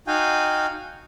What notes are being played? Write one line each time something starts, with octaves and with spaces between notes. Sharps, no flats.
D#4 F#4 F5 G5 G#5